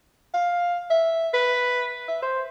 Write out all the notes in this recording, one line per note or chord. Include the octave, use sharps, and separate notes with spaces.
F5
E5
B4
E5
C5